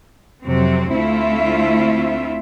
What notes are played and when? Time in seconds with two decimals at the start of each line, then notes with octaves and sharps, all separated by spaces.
0.45 F2 C3 F#3 C4
0.95 D2 A3 C4 E4 F4 E5